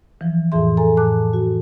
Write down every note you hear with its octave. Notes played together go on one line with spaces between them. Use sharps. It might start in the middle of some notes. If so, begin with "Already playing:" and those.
E3 F3
F2 A2 E3 G#4 E5 C6
A4 G#5 A#5
A2 A5 D6 F#6
F#4